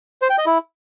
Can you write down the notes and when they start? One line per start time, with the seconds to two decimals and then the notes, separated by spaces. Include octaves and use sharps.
0.22 C5
0.30 G5
0.38 D#5
0.46 E4